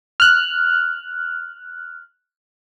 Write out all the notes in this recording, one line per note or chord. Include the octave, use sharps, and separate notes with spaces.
F6 F#6